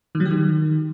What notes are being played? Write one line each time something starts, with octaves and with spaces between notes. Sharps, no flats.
D#3
F#3
G4
D#3